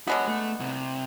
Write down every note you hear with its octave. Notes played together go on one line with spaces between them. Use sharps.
D3 G#3 B3 F#4 C#5
A3
C2 C3